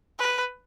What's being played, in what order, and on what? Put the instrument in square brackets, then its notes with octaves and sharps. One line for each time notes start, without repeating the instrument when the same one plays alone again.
[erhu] B4